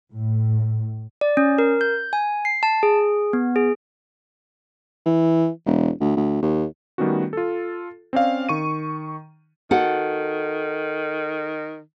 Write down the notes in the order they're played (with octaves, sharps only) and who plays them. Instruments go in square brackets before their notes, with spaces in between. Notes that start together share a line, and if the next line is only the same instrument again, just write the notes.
[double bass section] A2
[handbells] D5
C#4
A#4
G6
G#5
C7
A5
G#4
B3
G#4
[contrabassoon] E3
E1
D2
D2
D#2
[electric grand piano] D#3 G3 A3 B3 C#4 F#4
F4 A4
C4 C#4 D5 F5
D#3 C#6 D#7
[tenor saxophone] D#3 [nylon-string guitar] F#4 A4 F#5